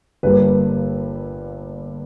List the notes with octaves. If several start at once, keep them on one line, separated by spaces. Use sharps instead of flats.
G1 G2 G3 A#3 B4